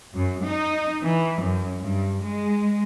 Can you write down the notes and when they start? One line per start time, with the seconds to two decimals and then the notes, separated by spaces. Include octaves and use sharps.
0.14 F#2
0.46 D#4
1.01 E3
1.41 F#2
1.81 G2
2.24 G#3